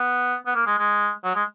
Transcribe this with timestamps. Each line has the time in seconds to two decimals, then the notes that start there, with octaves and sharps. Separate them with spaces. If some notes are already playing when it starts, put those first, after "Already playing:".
Already playing: B3
0.46 B3
0.55 A#3
0.67 G#3
0.78 G#3
1.24 F#3
1.35 G#3